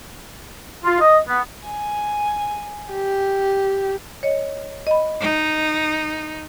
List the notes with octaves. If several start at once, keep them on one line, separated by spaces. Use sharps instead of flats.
F4
D#5
B3
G#5
G4
C#5 D#5
D#5 B5
D#4